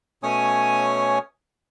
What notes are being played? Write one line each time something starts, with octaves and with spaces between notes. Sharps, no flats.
B2 A3 C#4 C#5 G#5 D#6